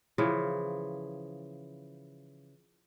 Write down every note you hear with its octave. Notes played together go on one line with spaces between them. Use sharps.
C#3 E3 F3